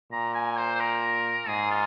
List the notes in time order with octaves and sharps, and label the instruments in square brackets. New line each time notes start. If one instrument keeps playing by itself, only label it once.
[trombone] A#2 [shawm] A#5
[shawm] G#5
C5
C5
A#4
[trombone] G#2 [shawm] G#4
[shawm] F4